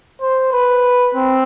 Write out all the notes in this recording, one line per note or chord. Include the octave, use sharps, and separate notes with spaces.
C5
B4
C4